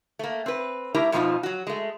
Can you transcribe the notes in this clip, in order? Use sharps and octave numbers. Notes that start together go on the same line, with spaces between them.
A3 A#3
C4 B4
A3 E4 G4 A#4 E5 A#5
F2 B2 F3 B3 D#4 F4
F#3 F#4
G#3 A3